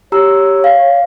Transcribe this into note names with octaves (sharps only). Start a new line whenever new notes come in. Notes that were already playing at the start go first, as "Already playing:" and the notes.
G4 C#5 A#5 E6
F5